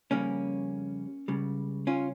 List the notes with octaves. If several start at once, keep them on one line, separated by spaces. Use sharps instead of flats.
F2 C#3 G3 A#3 C#4
C#2 C#3 G3
C#4 F4